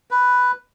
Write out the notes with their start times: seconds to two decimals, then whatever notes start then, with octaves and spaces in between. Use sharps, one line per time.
0.11 B4